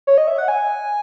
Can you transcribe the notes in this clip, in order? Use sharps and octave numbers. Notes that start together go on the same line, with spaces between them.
C#5
D#5
E5
F#5
G#5